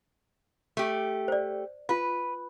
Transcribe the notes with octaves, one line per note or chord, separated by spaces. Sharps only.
A3 G4
C5 D5
F4 B4 F5